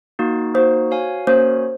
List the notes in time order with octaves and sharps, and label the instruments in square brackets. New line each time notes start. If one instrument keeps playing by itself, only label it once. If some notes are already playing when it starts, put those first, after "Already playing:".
[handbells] A#3 D#4 F#4
[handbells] A#3 D#4 F#4 [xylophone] C5
[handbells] F#4 C#5 F5 G#5
[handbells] A#3 C#4 F#4 A#4 C#5 [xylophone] C5